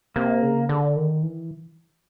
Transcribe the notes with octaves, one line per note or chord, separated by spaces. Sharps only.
C3 A#3
C#3
D3
D#3
E3